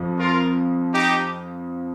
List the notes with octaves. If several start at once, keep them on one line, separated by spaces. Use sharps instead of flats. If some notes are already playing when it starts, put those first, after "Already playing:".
Already playing: F2 F3
F4 A#4
D#4 G4